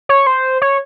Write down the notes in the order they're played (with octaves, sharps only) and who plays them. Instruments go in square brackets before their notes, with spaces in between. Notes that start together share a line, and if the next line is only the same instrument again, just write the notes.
[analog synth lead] C#5
C5
C#5